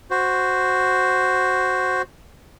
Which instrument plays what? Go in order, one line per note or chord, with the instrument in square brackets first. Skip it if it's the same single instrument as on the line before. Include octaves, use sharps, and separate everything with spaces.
[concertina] F#4 C5